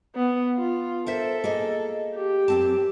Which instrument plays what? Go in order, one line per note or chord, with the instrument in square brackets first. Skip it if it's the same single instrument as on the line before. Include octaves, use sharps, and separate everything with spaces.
[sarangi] B3
F4
[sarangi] A4 [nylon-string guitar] A#4 C5 E5
[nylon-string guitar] A#3 G#4 D#5
[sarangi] G4
[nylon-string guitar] F#2 C4 A5